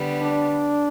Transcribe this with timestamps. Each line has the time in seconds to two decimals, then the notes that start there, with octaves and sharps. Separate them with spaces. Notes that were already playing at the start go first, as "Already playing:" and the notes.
Already playing: D3 G3 B3
0.22 D4